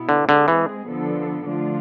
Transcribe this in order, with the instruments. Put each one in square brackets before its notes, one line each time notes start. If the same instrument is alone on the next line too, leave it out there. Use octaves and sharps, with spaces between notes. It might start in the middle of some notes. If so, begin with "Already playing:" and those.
Already playing: [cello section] B2 B3 E4
[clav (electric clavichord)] D3
[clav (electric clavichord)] D3 [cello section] G#3 C4 G#4
[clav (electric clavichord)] E3
[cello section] D3 F3 B3 D4 A4
D3 F3 A3 D4 F4